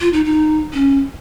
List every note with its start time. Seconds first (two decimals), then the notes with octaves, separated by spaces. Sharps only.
0.01 F4
0.13 D#4
0.25 D#4
0.73 C#4